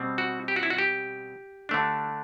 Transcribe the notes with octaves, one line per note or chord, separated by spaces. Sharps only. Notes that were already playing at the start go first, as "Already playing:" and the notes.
Already playing: B2 G3 C4
F#4
G4
F#4
E4
F#4
G4
D3 A3 D4